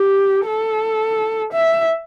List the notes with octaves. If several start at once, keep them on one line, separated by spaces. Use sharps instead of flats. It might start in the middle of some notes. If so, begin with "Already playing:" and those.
Already playing: G4
A4
E5